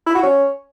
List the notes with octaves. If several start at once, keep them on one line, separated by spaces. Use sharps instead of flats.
E4
F#4
C#4